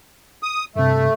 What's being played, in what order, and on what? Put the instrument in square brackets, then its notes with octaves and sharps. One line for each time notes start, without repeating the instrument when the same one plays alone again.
[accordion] D#6
[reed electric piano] G2 C3 [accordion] A3